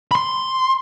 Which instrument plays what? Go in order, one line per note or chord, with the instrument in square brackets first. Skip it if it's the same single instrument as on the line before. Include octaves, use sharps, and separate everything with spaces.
[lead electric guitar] B5 C6